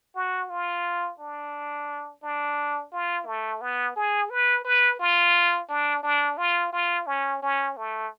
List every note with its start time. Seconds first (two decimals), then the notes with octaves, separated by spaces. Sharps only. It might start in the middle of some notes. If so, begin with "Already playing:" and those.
0.16 F#4
0.50 F4
1.20 D4
2.23 D4
2.92 F4
3.26 A3
3.61 B3
3.96 G#4
4.30 B4
4.65 B4
4.99 F4
5.69 D4
6.03 D4
6.37 F4
6.73 F4
7.07 C#4
7.42 C#4
7.77 A3